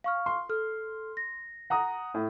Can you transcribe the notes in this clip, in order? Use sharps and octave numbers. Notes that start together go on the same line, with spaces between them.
F5 C#6 F6
C6
A4 F6
A#6
F#5 A#5 D#6
A2